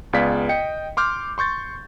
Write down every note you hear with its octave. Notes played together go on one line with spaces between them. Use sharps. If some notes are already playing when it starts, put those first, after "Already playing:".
C#2 B3 G#4 D5 F5 B6
D#5 G5 C#7
C6 D6 F6 G6
C6 C#6 G6 A6